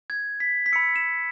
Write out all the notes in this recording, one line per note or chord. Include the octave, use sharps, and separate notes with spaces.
G#6
B6
B6
B5 E6 C#7
E7